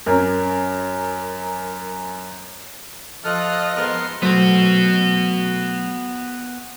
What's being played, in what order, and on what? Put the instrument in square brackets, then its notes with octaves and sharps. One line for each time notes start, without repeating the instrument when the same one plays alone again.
[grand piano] F#2 [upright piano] C#4 A#4
[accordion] F3 F6 F#6 [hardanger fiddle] F4 [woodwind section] A4 [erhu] D#5
[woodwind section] G#2 A#4 [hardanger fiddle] B3 C6
[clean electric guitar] F#3 A3 C5 [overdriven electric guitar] B3 F#4